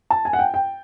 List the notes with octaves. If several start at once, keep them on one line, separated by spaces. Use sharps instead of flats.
A5
G#5
F#5
G5
G5